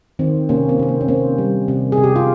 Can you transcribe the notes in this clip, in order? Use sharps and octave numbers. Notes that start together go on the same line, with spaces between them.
D#3 C4
C3 A#3 C#4
C4
C3 C4
A#3
C#4
A#3 C4
G3
C3
G#4
C3
G4
F4